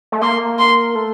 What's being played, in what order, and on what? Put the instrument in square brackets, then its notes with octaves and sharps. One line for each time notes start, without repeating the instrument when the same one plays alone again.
[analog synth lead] A3
[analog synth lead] A#3 [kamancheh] C6
[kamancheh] C6
[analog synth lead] A3